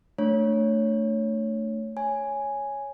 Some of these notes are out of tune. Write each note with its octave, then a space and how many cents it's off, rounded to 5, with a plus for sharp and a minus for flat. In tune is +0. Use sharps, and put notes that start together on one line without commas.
A3 +10 D4 +5 C#5 +0
C#5 +0 G#5 +0